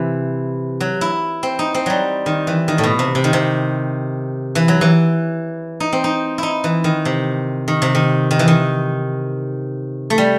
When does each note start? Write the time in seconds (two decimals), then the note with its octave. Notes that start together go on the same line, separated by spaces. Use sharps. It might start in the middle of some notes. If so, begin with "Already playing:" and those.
Already playing: C3 E3
0.80 F#3
1.01 E4
1.43 C4
1.59 D#4
1.74 C4
1.86 F#3 G3
2.26 D#3
2.47 E3
2.68 D#3
2.78 A2
2.84 B2
2.99 C3
3.15 C3
3.24 D#3
3.33 C3
4.55 E3
4.68 F#3
4.81 E3
5.80 D#4
5.93 C4
6.04 D#4
6.38 D#4 E4
6.64 E3
6.84 D#3
7.05 C3
7.68 D#3
7.82 C3
7.95 D#3
8.31 D#3
8.39 E3
8.48 D#3
10.10 A3
10.18 G3